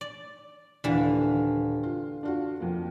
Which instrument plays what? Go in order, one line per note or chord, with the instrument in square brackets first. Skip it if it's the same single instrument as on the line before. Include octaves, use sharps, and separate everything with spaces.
[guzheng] D5
[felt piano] D#1 F5 [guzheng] D3 E3
[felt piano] F4
D4 F4 F#4
F2 A#3